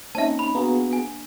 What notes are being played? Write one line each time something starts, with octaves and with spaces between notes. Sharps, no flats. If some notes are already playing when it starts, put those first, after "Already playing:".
A#3 C4 C#4 D#4 E5 A5
B5
B3 D4 F#4 G#4 F5 A#5
G#5